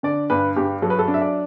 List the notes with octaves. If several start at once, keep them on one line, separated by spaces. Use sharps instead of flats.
D3 D5
G2 B4
G2 G4
F#3 A4
B4
A4
D4
E5
D5